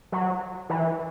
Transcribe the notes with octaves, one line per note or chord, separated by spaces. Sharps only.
F#3
E3